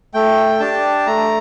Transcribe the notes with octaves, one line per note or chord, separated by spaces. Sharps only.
A3 G5
D4 G4 A5
A3 A#5